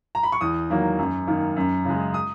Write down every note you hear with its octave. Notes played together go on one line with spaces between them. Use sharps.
A#5
B5
C#6
E2 D#6
D#3 F#3 A#3
F#2
D#3 A#3
F#2
C#3 G#3
D#6